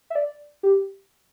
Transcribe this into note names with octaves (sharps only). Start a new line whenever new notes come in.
E5
D5
G4